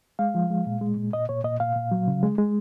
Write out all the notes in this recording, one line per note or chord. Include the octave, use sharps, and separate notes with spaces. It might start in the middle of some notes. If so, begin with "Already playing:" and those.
G#3 F5
F3
G#3
A#2
G#3
A#2
A#2 D#5
A#2 C#5
A#2 D#5
A#2 F5
A#2
F#3
C#3
G#3
G#3